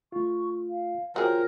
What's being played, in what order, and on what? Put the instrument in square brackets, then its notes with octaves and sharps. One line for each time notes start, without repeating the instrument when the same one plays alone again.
[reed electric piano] A3 F4 [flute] C#6
[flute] F5
[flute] F4 [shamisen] F#4 G#4 [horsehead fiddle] A#4 [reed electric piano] C5 C#5 G5